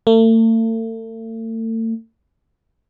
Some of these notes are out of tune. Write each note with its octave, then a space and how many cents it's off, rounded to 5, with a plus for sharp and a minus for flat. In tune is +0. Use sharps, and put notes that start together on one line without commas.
A3 +40